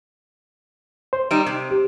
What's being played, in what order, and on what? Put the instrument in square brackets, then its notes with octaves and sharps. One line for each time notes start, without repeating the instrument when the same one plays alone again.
[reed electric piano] C5
[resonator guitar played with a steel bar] G3 D#4 [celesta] D7 E7
[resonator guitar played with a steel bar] C3
[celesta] G4